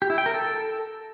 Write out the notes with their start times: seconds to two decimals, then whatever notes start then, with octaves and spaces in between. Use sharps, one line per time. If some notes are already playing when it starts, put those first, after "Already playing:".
0.02 G4
0.10 E4
0.18 G5
0.26 A#4
0.34 A4